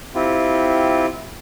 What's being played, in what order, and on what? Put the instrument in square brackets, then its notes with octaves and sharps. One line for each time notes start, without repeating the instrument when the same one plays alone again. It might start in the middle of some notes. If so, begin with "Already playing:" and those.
[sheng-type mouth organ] C4 E4 F4 G4